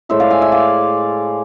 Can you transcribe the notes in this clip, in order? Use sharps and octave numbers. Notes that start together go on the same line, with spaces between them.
A2 G#3 C5 E5
D5 F5
E5 G#5
E5 G#5
D5 F5